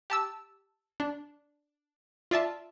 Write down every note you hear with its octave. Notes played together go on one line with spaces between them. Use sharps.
G4 A5 E6
D4
F4 D5 E5 A5